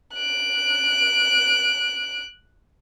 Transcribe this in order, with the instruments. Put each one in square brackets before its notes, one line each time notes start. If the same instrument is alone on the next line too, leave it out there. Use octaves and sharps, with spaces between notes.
[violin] F#6 D7